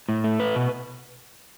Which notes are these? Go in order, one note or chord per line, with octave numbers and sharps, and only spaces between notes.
A2
A3
B4
B2